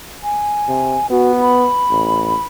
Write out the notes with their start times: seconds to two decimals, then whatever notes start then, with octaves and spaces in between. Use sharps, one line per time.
0.23 G#5
0.68 C3
1.10 B3 F#4
1.41 B5
1.90 A1